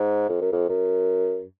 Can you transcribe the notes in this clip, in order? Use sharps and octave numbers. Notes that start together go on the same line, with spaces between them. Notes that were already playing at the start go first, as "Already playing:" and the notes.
Already playing: G#2
F2
F#2
F2
F#2